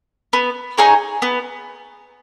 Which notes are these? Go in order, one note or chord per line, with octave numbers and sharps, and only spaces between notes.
B3
D#4 G#4 C#5
B3